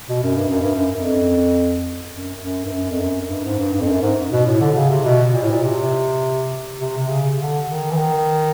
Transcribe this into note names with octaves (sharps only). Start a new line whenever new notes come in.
B2
F#2
G2
F#2
G2
F#2
F2
F#2
F#2
G2
F#2
F2
F#2
G2
G#2
G2
G2
F2
F#2
G#2
B2
A2
D3
C#3
C3
B2
A#2
A2
A#2
C3
C3
C3
C#3
D3
D#3
E3
D#3